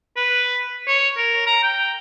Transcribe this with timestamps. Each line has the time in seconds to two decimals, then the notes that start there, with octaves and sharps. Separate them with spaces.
0.17 B4
0.87 C#5
1.18 A#4
1.47 A#5
1.63 G5